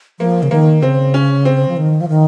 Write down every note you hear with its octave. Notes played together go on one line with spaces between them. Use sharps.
F3 A#3
C#3
D#3 A#3
C#3 C4
C#4
C4
F3
D#3
F3
D#3